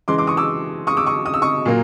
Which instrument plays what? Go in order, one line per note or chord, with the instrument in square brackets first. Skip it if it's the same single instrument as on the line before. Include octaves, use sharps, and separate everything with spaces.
[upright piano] C#3 E3 G#3 C6 D6
C6 D6
C#6 D#6
D6 E6
C#6 D#6
D6 E6
C#6 D#6
D#6
E6
C#6 D#6
A#2 F#3 A#3